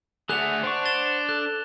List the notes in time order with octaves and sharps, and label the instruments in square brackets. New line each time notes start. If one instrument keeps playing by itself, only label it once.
[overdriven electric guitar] D3 A3 [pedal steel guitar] G#4 F#5 [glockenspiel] F#6 F7
[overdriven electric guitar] D4 [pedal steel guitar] C5 F#5 C#6
[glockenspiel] A6 E7 G7
[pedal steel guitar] A4 [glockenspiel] F#6